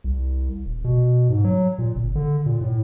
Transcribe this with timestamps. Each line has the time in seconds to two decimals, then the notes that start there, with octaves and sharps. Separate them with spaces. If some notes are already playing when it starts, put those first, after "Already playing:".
0.04 C2
0.66 D#1
0.84 B2
1.30 G#2
1.44 F#3
1.79 A#2
1.96 G1
2.16 D3
2.46 A#2
2.61 A2